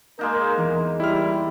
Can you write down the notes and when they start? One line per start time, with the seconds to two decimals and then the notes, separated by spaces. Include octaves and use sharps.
0.19 G#3 A#3 D#4 A#4
0.58 E2 E3
1.00 G3 E4 F6